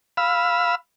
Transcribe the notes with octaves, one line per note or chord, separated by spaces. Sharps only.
F5 B5 E6